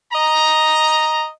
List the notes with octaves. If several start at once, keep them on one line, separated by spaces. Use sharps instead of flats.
D#5 A#5